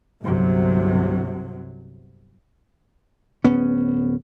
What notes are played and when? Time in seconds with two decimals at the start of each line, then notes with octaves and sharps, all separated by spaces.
0.24 G1 C2 C3 F#3
3.44 D1 B3 C#4